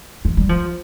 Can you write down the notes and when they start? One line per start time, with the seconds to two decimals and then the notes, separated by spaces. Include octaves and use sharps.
0.25 F3
0.37 G3
0.49 F3